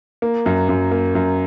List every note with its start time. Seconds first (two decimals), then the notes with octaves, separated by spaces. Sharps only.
0.22 A#3
0.46 F#2
0.69 F#2
0.91 A#3
1.15 F#2